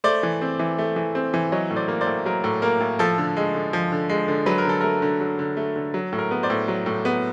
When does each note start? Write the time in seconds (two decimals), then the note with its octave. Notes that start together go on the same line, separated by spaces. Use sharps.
0.04 A3 C5 D5
0.23 E3
0.42 C4
0.59 E3
0.78 A3
0.96 E3
1.15 C4
1.34 E3
1.52 F#3 C#5 D#5
1.70 A2
1.76 C5 D5
1.88 A#3
2.01 C5 D5
2.07 A2
2.26 F#3 A#4 C5
2.44 A2
2.62 A#3 A#4
2.80 A2
2.99 F3 A4
3.18 D3
3.37 G#3
3.55 D3
3.73 F3
3.92 D3
4.09 G#3
4.28 D3
4.46 F#3 B4
4.58 A#4
4.65 D3 A4
4.81 A3 A#4
5.02 D3
5.20 F#3
5.39 D3
5.57 A3
5.76 D3
5.94 F#3
6.13 A2
6.19 A#4
6.31 B3
6.43 C5 D5
6.50 A2
6.68 F#3
6.86 A2
7.05 B3